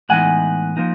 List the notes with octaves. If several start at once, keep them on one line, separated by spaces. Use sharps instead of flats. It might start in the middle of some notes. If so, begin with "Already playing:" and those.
A2 E3 G#3 B3 D#4 F#5 G#5
F3 A#3 D#4